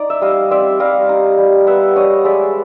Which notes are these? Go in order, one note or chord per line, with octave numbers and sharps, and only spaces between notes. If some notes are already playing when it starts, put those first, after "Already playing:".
Already playing: D#4 D5
E5
G3 D#5 F5
C4 D5 E5
G3 D#5 F5
D#4
G3
B3 E5 F#5
D4 C#5 D#5
G#3 D5 E5